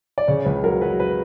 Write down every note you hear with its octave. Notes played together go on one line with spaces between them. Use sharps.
D5
C#3 C#5
C#2 B4
F#3 A#4
F#3 B4
B4